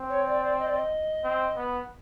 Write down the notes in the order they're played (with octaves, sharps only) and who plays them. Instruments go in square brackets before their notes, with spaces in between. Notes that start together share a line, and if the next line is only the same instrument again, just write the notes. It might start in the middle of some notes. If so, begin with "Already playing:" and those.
Already playing: [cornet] C4
[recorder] C#5
D5
D5
D#5
D5
D#5
[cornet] C4
B3